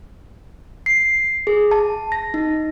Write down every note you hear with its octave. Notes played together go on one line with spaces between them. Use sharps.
C7
G#4
A5
A#6
D#4